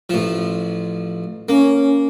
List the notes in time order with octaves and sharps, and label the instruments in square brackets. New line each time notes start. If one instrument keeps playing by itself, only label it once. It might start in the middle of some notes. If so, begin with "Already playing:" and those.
[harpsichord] A1 F3
[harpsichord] A#3 [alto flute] C#4